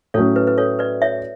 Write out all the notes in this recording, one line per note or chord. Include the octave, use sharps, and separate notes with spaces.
A2 F#3 A3 C#4 A4 C#5
B4
B4
A4 C#5
B4 D5
C#5 E5